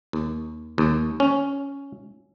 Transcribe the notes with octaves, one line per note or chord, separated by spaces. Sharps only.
D#2
D#2
C#4